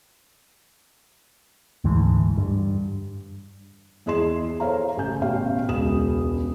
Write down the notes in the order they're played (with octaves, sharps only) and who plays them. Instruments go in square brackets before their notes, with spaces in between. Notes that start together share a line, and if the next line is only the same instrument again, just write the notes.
[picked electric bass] D2 G#2 E3
G2
[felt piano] E2 E4 G#4 D#5 C6 E7
A4 C5 C#5 F5 A#5
A1 C#3 G#5 G6
A1 B2 F#4 F5 G5
E1 C#2 D#6 E7